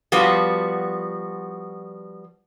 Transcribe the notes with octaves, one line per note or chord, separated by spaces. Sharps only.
F3 G3 B3 F#4 C5